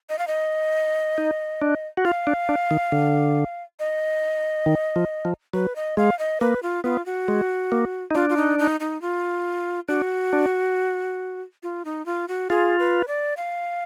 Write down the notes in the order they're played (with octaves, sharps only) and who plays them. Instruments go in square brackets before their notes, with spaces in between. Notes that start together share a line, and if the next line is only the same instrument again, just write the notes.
[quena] D#5
F5
D#5
[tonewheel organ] D#4
D4
F#4
[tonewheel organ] F4 [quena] F5
[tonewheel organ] D4
D4
D#3
D3
[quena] D#5
[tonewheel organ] D#3
F3
F3
[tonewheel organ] F#3 [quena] B4
[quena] D#5
[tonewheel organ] G#3 [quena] F5
[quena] D#5
[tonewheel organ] A#3 [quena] B4
[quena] F4
[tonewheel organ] B3 [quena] F4
[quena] F#4
[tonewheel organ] G#3
A#3
D#4
[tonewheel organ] D4 [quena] F4
[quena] F4
D#4
D#4
D#4
F4
[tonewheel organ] D4 [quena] F#4
[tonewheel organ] D4
[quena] F4
D#4
F4
F#4
[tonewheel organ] F4 [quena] G#4
[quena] B4
D5
F5